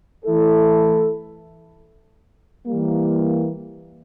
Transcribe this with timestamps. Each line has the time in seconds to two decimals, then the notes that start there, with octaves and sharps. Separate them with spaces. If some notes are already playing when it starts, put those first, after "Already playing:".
0.25 E3 A3 E4 A4
2.67 E3 G3 A#3